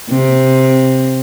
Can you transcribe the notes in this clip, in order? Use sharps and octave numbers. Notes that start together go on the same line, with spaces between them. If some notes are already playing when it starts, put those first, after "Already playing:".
C3